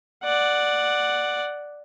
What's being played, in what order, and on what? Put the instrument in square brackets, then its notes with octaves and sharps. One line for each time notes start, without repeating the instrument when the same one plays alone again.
[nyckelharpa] D5 F#5